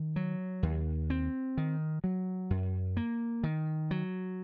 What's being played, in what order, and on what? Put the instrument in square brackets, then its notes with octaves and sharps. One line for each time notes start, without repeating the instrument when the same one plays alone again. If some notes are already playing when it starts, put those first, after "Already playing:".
Already playing: [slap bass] D#3
F#3
D#2
C4
D#3
F#3
F#2
A#3
D#3
F#3